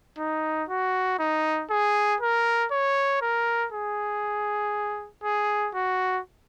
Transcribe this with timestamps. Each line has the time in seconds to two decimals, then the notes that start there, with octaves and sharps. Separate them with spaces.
0.18 D#4
0.69 F#4
1.19 D#4
1.71 G#4
2.21 A#4
2.72 C#5
3.22 A#4
3.72 G#4
5.24 G#4
5.75 F#4